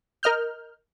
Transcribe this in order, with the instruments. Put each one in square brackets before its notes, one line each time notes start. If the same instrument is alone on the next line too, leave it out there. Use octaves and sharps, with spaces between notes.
[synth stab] A#4 D#5 F6 G6